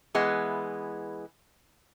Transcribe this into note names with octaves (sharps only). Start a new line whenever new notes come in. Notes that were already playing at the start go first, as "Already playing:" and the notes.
E3 G#3 B3